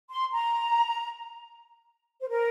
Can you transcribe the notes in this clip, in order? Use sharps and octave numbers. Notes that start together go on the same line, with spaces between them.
C6
A#5
C5
A#4